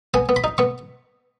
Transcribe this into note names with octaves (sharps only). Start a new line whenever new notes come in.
B3 G#5
B3
B5
D#4
B3 C#6